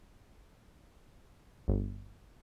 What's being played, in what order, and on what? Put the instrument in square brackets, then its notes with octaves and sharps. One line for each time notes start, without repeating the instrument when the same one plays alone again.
[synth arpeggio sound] G1